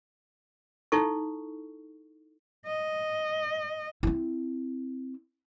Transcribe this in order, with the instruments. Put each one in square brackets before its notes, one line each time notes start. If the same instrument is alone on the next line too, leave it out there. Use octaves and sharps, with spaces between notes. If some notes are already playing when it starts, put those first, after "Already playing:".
[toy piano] D#4 E4 A4 C#6
[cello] D#5
[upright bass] C4 E4